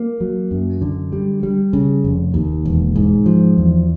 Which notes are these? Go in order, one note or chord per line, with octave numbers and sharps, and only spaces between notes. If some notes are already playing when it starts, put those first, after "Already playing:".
Already playing: A#3
F#3
F#2
D3
G3
G3
C#3
F1
D#2
E1
G#2
F3
E2